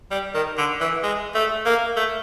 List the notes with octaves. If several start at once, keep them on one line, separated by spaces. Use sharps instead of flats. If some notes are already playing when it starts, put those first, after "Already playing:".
G3
D#3
D3
E3
G#3
A3
A#3
A3